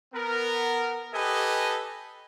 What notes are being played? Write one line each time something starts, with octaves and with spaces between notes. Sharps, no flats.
B3 A#4
G4 A4 B4 D#5 G#5